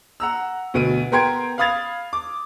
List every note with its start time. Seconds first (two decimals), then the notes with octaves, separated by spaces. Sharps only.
0.20 F#5 A#5 E6
0.74 D2 B2 D7 D#7
1.12 B3 A#4 G5 C6 G#6 D7
1.58 F5 B5 D#6 G#6 A6 F7
2.13 D6